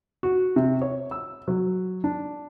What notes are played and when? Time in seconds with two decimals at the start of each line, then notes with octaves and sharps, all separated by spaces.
0.23 F#4
0.56 C3
0.82 C#5
1.11 E6
1.48 F#3
2.04 D4